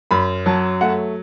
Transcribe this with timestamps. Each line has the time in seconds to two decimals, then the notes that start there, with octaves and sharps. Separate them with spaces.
0.11 F#2 B5
0.46 F#3 A5
0.81 A3 F#5